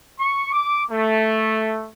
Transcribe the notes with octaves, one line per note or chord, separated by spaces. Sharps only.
C#6
D6
A3